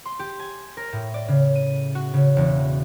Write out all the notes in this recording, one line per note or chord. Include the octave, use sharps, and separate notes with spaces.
C6
G4
G#5
A#4
A2
D5
C#3
D#7
F#4
C#3
E1